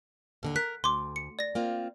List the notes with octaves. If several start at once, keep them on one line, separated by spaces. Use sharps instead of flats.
D#2 D3 A#5
A#4 F#6 B6
D2 C6 D6
C#7
D5 A#6
A#3 C4 F4